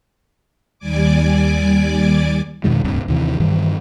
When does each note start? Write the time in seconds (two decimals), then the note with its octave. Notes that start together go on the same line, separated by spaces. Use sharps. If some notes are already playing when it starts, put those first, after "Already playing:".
0.79 D#2 G3 D5 G#5 D6
2.64 F2 B2 D#3 G#3
2.84 D1 C2 G2 C3
3.08 D#2 C3 E3
3.40 G2 D#3 E3 G3